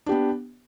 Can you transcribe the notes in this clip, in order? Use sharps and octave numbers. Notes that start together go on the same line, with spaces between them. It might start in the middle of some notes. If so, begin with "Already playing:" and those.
B3 D4 G4